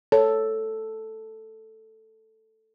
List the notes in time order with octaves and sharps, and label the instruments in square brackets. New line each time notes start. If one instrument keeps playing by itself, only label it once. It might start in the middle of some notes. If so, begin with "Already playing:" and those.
[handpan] A4 [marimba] C#5